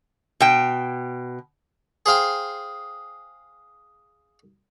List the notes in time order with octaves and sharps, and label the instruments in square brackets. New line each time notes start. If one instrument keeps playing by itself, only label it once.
[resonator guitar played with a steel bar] B2 G5
[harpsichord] G#4 C5 F5 G5